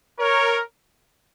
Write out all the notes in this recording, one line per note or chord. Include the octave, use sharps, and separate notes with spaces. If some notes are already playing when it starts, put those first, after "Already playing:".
A#4 C#5